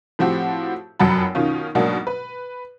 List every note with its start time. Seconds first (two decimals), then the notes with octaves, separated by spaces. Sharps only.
0.19 A2 F3 C4 F#4 G4
0.99 F1 F#2 F#3 F#5 A5 B5
1.35 B2 D#3 C#4 F4
1.75 G#2 B2 F#3 A#3 D4 F#4
2.07 B4